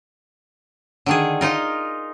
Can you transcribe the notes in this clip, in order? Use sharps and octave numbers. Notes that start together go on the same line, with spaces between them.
D3 D#3 G#4
D#4 F4 A#4